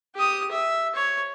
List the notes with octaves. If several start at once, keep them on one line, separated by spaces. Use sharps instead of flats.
G4 D#6
E5
C#5